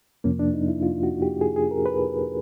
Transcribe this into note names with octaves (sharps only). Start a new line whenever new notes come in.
F2 C3 F3 A#3 C#4
D4
D#4
E4
F4
F#4
G4
G#4
G#4
A#4
B4